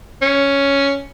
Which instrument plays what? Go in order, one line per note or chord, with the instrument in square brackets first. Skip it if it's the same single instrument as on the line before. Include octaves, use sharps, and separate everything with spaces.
[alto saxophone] C#4